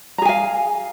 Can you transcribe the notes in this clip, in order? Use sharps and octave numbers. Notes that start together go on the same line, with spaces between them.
G#4 F5 G#5 A#5